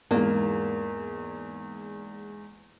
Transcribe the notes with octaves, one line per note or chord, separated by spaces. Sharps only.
E2 G#2 A#3